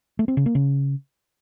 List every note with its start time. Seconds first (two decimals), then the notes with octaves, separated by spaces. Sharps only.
0.19 A3
0.28 C4
0.37 C#3
0.46 A#3
0.55 C#3